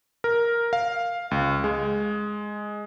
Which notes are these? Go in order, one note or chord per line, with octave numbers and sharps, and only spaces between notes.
A#4
F5
C#2
G#3